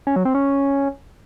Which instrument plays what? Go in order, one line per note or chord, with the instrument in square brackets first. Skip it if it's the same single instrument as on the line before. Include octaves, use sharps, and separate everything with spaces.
[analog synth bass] C#4
F#3
C4
C#4